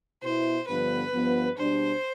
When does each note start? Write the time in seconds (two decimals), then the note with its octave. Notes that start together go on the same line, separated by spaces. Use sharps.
0.22 B2 B3 E4 C5
0.67 G2 D3 F3 B3 B4
1.13 G2 F3 B3
1.57 B2 G3 D4 C5